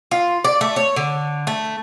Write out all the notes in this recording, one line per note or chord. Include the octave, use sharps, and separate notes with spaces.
F4
D5
A3
C#5
D3
A3